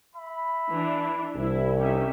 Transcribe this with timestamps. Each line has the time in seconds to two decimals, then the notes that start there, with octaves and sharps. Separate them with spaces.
0.16 E5 B5
0.70 E3 D4
1.36 C2 C3 E4
1.79 C#4 D#4 G4 E5